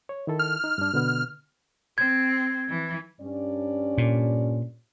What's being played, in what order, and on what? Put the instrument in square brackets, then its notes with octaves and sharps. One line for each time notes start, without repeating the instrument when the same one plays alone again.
[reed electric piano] C#5
D#3 E4 A4
[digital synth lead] F6
[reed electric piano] D#4
G2 D4
B2 D3 B3
[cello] C4 [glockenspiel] G#6
[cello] E3
[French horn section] G2 C#4 D5
[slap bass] A#2